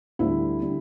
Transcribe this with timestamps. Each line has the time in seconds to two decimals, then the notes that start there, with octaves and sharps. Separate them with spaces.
0.19 D2 D3 G3 E4
0.62 D3 G3